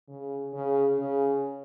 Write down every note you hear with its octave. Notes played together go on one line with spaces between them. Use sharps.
C#3
C#3
C#3